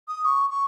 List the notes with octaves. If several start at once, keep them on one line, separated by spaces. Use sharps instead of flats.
D#6
C#6
C#6